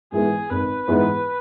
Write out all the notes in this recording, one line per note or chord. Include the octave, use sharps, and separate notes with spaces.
G#2 E3 G#3 B3 G#4
G#1 B4
G#2 E3 G#3 B3